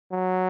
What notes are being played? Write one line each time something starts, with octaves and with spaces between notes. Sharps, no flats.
F#3